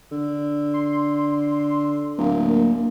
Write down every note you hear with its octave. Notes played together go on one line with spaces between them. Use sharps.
D3
C6
D1 A#3